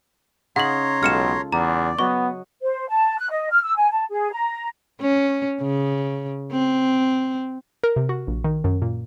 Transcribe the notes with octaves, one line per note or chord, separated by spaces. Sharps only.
C#3 D#4 C#5 F#5 A#5 C6 F#7
B1 G#3 F4 A4 F6 C#7 E7
E2 D5 A#5
F#3 B3 F#4 D#5 C#6
C5
A5
F#6
D#5
F6
E6
G#5
A5
G#4
A#5
C#4
C#3
C4
A#4
C3
F#4
A#1
D#3
F#2
A#2